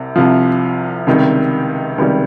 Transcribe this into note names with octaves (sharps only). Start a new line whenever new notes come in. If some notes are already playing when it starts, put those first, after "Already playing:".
Already playing: C2 C3
C2 C3 F3
C#2 C3 D#3 G3
C#2 C3 D#3 G3